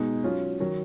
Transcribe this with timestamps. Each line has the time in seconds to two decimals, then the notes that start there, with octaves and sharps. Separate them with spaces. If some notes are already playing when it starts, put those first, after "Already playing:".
Already playing: B2 G#3 D#4
0.24 F#3 C#4 F4
0.60 D#3 F#3